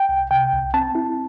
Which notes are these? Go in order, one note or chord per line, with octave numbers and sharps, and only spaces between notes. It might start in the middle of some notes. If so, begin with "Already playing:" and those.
Already playing: G5
C2
C3 G5
C2
C4 A5
E4